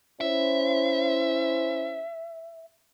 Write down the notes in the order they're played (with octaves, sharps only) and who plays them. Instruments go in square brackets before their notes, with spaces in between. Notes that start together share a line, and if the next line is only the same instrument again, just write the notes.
[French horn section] C#4 E4 C5 [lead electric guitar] E5